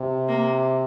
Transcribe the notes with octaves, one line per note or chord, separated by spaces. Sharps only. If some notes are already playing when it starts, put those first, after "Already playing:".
Already playing: C3
A#3